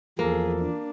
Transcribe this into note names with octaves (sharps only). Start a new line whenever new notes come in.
E2 F3 A#3 G#4 A4
D4